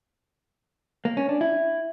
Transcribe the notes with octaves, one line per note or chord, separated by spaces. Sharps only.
A#3
C#4
D4
E4